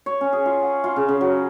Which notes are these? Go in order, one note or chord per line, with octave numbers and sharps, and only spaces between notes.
C#5
C#4
G#4
F4
F#5
F4
C#3
C#3
F#3